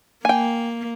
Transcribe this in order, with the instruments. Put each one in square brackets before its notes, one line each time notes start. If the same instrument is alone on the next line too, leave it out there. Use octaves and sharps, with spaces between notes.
[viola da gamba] A#3 [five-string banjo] G5 G#5